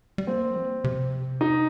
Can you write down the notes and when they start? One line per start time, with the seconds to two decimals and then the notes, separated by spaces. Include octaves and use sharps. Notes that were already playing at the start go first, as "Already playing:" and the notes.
0.18 G3
0.27 A#3 C4
0.56 F3
0.84 C3
1.41 D#4